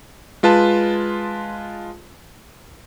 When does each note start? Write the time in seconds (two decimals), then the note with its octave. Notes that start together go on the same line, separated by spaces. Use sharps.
0.43 G#3 F4 B4 A5